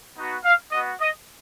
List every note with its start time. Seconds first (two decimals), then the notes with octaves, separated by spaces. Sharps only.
0.16 B3 D#4 F#4
0.44 F5
0.71 B3 F#4 D#5
1.00 D#5